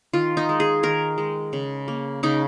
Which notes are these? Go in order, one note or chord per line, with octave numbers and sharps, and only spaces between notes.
D#3 F4
D#4
G#3
G#4
D#3 A#4
G#3
C#3
A#3
C#3 D#4